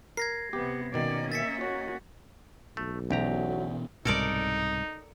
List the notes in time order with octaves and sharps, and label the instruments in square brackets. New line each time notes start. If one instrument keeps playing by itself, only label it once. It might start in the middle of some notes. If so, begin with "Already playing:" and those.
[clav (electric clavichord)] A#4 [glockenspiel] G#6 A#6 C7
[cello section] C3 B3 [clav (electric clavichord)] G4
[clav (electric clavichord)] B2 D#3 [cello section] A#3 C#4 D#5 [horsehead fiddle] D5
[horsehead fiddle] E5 [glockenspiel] A6 B6 C#7
[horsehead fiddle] F#4 [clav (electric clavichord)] C#5
[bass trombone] B1 [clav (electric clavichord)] A3
[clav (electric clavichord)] D2 G4 A#5 [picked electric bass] B2 E3 C#4 [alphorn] F#3
[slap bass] C2 G#2 B2 [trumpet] D#4 [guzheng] A4 A#4 D5